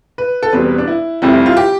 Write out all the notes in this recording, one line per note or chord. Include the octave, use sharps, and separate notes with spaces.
B4
A4
E1 E2 B2 G3 C4 B4
D4
E4
F1 F2 C3 G3 E4
F4
G4